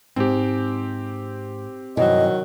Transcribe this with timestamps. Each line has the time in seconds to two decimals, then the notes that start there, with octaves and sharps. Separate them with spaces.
0.16 G#2 C4 G4
1.97 G2 C3 D#3 E3 F#3 D#5